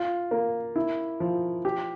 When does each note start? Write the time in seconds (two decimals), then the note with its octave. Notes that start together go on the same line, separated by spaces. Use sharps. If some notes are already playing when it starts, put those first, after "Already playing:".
Already playing: F4
0.31 A#3
0.76 E4
1.20 F3
1.65 G4